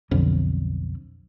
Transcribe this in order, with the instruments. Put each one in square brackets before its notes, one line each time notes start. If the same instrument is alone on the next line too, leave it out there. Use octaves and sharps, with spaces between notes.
[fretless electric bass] B1 F2 D3